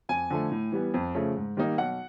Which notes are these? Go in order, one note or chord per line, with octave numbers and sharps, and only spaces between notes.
F2 G#5
D3 F3 A3
A2
E3 G3 B3
F2
C#3 F3 A3
G#2
D#3 G3 A#3 D#4
B1 F#5